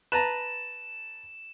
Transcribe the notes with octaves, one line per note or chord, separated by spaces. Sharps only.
B4 A5 A#5 E7